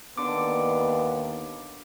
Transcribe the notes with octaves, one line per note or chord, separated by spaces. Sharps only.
D#2 D3 B3 D6